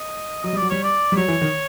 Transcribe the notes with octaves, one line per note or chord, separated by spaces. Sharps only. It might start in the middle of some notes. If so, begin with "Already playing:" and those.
Already playing: D#5
F#3 D#5
G3
F#3 D5
G3 C#5
D5
G3
F#3 C#5
E3
D#3